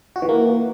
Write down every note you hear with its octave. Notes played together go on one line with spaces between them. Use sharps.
F#4
E3
A#3